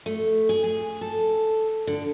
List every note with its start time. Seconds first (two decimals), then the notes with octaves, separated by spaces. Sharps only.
0.06 A3
0.49 G#4
0.64 G#4
1.01 A4
1.87 D3